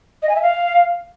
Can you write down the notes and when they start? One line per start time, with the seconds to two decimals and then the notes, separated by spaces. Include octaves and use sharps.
0.22 D#5
0.29 G#5
0.36 E5
0.42 F5